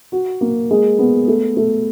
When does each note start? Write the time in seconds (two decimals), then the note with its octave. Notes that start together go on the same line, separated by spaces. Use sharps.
0.12 F#4
0.41 A#3
0.71 G#3
0.99 B3
1.28 A3
1.57 A3